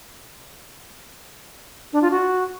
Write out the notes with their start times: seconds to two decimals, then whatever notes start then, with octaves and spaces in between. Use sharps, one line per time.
1.92 D4
2.01 F4
2.11 F#4